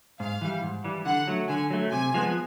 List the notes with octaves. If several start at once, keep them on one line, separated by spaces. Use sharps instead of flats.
G#2 F5
E3 G3
G#2
E3 G3
D3 F#5
F#3 A3
D3 G#5
F#3 A3
C3 G#5
F3 G#3 B3